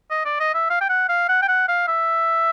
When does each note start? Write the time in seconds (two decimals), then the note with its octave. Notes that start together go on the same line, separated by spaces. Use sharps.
0.10 D#5
0.25 D5
0.40 D#5
0.54 E5
0.70 F5
0.81 G5
0.89 F#5
1.09 F5
1.29 F#5
1.42 G5
1.48 F#5
1.68 F5
1.88 E5